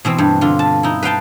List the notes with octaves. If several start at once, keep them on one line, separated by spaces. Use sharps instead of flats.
B2 E3 C4
G2
D3 F4
A5
D#4 E4
B4 F5 G5 A5